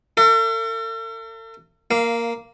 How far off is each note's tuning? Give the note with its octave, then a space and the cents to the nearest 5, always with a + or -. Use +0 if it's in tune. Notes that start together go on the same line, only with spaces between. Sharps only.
A4 +45 E5 +45
A#3 +0 F5 -15